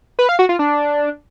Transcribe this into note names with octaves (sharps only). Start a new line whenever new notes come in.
B4
F5
F#4
F4
D4